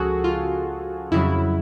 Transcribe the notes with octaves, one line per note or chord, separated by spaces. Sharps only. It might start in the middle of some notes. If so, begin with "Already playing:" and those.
Already playing: C#2 C#3 F3 F#4 G#4 A4
F4
F2 C#3 F#3 E4